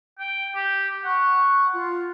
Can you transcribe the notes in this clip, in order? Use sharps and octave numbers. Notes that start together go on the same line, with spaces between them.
G5
G4
F#5 C#6
F4